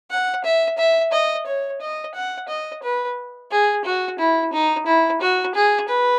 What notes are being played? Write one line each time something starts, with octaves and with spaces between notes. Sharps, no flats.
F#5
E5
E5
D#5
C#5
D#5
F#5
D#5
B4
G#4
F#4
E4
D#4
E4
F#4
G#4
B4